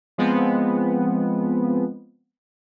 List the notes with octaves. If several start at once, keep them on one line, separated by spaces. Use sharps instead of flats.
F3 G#3 B3 C4